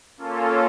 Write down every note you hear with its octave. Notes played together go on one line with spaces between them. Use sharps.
A#3 C#4 F4 A4